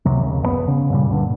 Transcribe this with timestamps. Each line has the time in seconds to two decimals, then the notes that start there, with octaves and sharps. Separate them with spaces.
0.05 F1 C#2 C3 F#3
0.21 D#2 C#3
0.42 F#1 B2 B3
0.68 C#3
0.90 G2 A#2 C#3 G3
1.08 D2 G2 A#2 D3